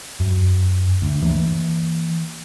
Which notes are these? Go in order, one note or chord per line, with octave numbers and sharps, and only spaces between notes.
F#2
D2
E3 A#3